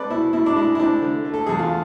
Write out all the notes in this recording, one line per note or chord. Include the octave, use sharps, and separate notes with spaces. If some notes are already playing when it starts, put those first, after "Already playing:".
Already playing: G#3 C4 A4 B4 D5
B2 E4
B2 E4
D4
G#3 E4
E4
C4 D4
D3
A3
A4
E2 G#4
F4